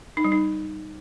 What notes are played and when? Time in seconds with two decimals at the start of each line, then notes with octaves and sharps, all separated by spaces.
0.17 D#4
0.24 G3
0.32 D#4